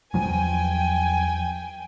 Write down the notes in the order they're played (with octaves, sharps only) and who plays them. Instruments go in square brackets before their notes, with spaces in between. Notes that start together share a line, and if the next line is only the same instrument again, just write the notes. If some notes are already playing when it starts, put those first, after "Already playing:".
[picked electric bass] E2 F3 F#3 [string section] G5 G#5